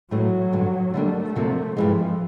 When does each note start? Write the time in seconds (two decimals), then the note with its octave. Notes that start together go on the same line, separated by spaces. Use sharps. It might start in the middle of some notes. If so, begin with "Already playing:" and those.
0.11 A2 E3 F#3 A3
0.52 G2 D3 G3
0.94 D3 G3 A3 A#3 D4
1.36 D2 C3 F3 A#3
1.77 G2 E3 F3 G#3